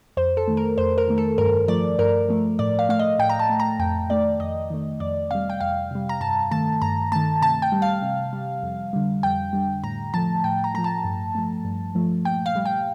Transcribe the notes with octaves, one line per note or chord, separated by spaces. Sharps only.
F2 C5
A4
D#3 A3
A#4
F2 C5
A#4
D#3 A3
A4
G2 A#4
F3 A3 D5
G2 A#4
F3 A3
A2 D5
F5
A3 F5
D#5
A2 G5
A#5
A5
A3
A#5
F2 G5
D#3 A3 D5
F2 D#5
D#3 A3
F2 D5
C3 G3 F5
G5
F2 F5
C3 G3
A#5
G2 A5
D#3 A3 A5
G2 A#5
D#3 A3 A5
C3 A5
G5
G3
F5
C3
G3
F2
D3 G3
F2 G5
D3 G3
A2 A#5
F3 A3 A5
A2 G5
A#5
F3 A3 A#5
A5
G2
F3 A3
G2
F3 A3
A#2 G5
F5
G3
G5